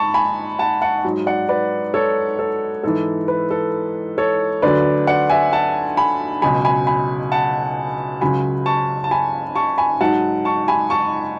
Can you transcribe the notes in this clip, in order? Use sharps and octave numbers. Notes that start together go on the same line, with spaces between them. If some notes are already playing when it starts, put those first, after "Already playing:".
Already playing: G#2 A5 B5 C#6
G#5 B5
F#5 A5
F#5 A5
G#2 F#3
D5 F#5
B4 D5
A4 C#5
A4
G#2 E3 A4
B4
A4
A4 C#5
D2 D3 F#3 B4 D5
D5 F#5
E5 G#5
F#5 A5
G#5 B5
C#2 B2 F#3 G#5 B5
G#5 B5
G#5 B5
F#5 A5
C#2 C#3 F#3 G#5 B5
A5 C#6
A5
G#5 B5
A5 C#6
G#5 B5
G#2 F#3 F#5 A5
A5 C#6
G#5 B5
A5 C#6